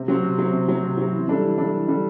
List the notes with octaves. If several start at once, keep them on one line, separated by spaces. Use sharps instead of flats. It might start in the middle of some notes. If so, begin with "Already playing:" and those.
Already playing: C3
F#3 C4
C3
F#3 C4
C3
F#3 C4
C3
F#3 C4
E3
G3 D4 A4
E3
G3 D4 A4
E3
G3 D4 A4